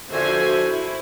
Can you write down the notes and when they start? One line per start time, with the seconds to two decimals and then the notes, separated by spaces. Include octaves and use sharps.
0.11 D3 F3 F#4 C5 E5 G#5
0.65 E4